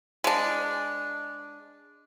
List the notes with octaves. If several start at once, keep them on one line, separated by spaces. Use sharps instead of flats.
G#3 D4